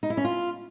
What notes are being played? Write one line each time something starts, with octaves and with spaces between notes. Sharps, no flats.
D#4
E4
C#4
F4